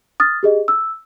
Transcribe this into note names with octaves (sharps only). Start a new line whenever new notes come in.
D#6 F6 A6
G4 G#4 D#5
E6